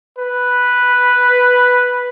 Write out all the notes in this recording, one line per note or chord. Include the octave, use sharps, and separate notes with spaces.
B4